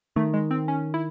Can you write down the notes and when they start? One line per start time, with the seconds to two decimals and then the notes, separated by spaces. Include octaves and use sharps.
0.16 D#3 A3
0.33 G#3
0.51 C4
0.68 C#4
0.94 E4